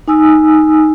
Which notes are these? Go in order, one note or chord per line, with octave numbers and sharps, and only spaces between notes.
D#4 G#5 D#6 E6